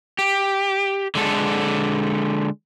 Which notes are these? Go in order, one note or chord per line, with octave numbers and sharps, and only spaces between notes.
G4
D3 G#3 A4